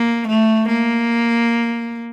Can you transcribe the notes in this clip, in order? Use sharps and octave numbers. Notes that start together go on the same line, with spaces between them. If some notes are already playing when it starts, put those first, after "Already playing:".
Already playing: A#3
A3
A#3